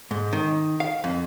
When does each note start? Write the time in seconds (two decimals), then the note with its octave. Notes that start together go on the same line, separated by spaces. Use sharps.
0.11 G#2
0.33 D#3
0.80 F5
1.04 F2